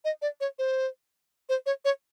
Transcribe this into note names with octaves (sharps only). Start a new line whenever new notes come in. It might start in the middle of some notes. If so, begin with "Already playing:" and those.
D#5
D5
C#5
C5
C5
C#5
C#5